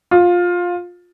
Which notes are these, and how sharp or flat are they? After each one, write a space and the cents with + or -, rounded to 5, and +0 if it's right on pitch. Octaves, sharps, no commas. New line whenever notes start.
F4 +15